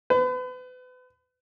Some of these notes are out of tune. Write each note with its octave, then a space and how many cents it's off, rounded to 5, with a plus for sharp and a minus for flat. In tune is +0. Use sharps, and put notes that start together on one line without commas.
B4 +35